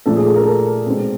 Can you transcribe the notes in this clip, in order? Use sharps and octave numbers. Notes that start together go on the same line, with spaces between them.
A#2 F3 A3 A4
G#4
A4
A#4
A4
B2 G#3 C4